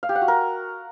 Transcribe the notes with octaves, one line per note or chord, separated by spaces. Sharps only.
F5
G4
F#5
F#4
A#4